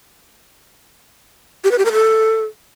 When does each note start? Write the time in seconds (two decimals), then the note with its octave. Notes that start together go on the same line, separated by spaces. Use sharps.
1.64 G4
1.71 B4
1.78 G4
1.85 A#4
1.92 A4